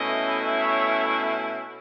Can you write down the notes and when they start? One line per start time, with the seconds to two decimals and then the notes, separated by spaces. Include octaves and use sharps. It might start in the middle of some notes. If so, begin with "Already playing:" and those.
Already playing: B2 A3 C#4 E4 B4 D#5
0.58 C#5 E5